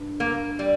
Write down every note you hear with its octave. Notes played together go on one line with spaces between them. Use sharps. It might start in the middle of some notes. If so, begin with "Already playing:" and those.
Already playing: G2
A#3
G3